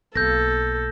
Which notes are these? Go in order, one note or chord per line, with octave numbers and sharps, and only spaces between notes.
B1 A#3 A4 G6 A#6